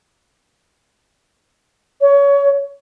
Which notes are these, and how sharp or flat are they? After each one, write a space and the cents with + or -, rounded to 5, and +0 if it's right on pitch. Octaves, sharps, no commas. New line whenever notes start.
C#5 +25